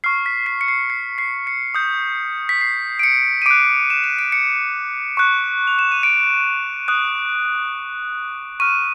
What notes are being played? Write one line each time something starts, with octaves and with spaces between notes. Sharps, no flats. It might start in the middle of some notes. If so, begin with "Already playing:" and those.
C#6 F6 C7
B6
C7
C#7
C7
C7
C7
C#7
D#6 G6
B6
C7
D7
C#7
D#7
D6 F#6 D7
E7
D#7
D7
C#7
C#6 F#6
F7
E7
D#7
D7
D#6 F#6
C#6 F6 D#7